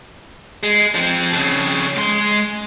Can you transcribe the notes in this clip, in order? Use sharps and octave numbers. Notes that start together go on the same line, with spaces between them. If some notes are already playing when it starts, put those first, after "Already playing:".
G#3
F3 C4
F2 C#3
G#3 C6